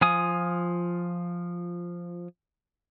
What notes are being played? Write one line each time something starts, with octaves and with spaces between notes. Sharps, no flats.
F3 F4 G#5 D#6